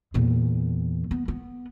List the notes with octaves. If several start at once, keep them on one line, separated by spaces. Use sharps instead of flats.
E2 A#2
B3
B3